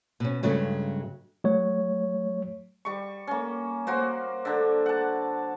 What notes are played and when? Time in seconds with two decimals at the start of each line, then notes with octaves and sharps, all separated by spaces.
0.20 B2 C#4
0.43 G2 C#3 F#3 G#3 A3 C#4
1.44 F#3 A3 C#5
2.85 G3 C#6
3.27 A#3 C#4
3.87 A#3 F#4 C5
4.45 D3 D4
4.86 F#5 A5